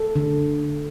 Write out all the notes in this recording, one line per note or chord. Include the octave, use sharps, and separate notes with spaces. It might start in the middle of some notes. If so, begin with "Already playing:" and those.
Already playing: A4
D3